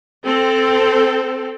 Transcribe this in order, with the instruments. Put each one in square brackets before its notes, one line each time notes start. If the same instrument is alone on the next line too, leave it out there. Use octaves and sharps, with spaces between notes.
[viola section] C4 A4